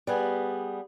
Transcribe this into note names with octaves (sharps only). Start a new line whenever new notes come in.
G3 B3 G#4